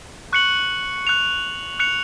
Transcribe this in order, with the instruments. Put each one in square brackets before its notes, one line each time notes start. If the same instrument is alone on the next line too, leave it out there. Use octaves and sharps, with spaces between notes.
[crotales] C#6 F#6 C#7 F#7
F#6 C#7 F7
F#6 C#7 F7